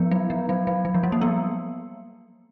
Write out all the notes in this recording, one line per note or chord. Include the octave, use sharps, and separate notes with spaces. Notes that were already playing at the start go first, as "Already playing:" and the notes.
Already playing: F3 B3
F#3
F3
F#3
F#3
F#3
F3
G3
A#3
B3